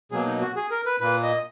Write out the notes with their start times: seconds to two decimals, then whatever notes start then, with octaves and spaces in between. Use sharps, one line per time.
0.11 B2 F#3 A#3 G#4
0.26 D#4
0.41 F#4
0.56 G#4
0.71 A#4
0.86 B4
1.01 A#2 A#3 B4
1.23 D#5